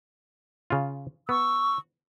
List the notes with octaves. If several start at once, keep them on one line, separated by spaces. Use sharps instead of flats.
C#3 F4
B3 C#6 E6